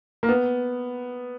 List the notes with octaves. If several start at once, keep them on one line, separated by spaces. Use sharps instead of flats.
A#3
B3